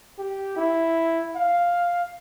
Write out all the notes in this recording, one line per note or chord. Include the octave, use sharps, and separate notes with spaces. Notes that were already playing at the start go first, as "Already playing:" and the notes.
G4
E4
F5